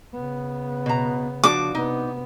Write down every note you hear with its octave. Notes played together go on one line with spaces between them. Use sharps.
C#3 B3
B2 A#5
F3 D4 F#4 D6
C3 B3 D#4